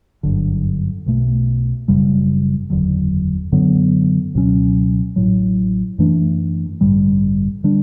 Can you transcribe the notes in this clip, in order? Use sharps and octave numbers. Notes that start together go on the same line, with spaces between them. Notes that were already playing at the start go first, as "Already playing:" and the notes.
G1 F#2 D3
B1 B2 A3
F#1 F#2 C#3 G3
F#1 E2 D3 F#3
F#2 D3 F#3 B3
C#2 B2 F#3 C#4
A1 A2 F#3
F#2 E3 A3 D4
A1 G2 D3 G3
D3 G3 D4